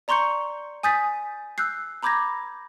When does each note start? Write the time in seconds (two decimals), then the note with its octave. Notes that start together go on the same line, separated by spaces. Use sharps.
0.08 D5 A#5 C6 C#6 G6 C#7
0.83 G#5 D#6 G6 A6 B6
1.58 E6 F#6 G6 C7
2.03 A#5 B5 D6 G6 G#6 A#6